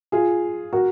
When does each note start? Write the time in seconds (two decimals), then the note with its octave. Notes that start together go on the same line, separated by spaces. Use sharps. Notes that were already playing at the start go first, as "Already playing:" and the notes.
0.12 F4 G#4
0.73 F#4 A#4